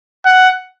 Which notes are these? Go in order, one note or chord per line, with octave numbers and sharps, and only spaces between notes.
F#5